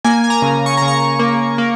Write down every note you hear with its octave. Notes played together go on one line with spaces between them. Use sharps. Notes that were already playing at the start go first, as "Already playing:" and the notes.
A#3 G#5
G#5
A#5
C#3
C#6
C#3 A#5
C#6
A#3
A#3